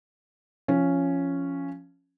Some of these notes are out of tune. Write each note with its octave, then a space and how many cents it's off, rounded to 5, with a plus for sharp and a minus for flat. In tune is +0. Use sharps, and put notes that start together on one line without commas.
F3 -15 C#4 +0